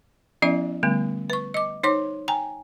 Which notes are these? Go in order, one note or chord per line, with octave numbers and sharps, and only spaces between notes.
F3 B3 C#4 E4 D5 E5
D3 G3 A3 B3
B4 C#6
D#5 D6
D#4 C5 C#5 C6 D6
G5 G#5 A#5